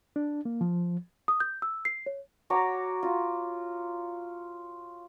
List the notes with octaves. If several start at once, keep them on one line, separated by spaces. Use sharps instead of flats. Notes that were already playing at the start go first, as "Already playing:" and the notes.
D4
A#3
F3
D#6
G6
E6
C7
C#5
F#4 C#5 A#5 D6
F4